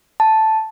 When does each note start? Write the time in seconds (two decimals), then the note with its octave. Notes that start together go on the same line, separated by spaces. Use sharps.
0.20 A5